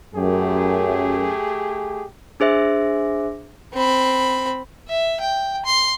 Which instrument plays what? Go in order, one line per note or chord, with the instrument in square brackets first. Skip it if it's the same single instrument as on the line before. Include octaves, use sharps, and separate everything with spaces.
[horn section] F#2 [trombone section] A3 G4 G#4
[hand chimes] D4 G#4 C5 E5
[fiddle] C4 B5
[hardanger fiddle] E5
G5
C6